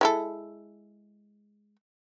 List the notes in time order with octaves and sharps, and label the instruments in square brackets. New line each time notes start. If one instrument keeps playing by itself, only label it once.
[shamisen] G#3 E4 A4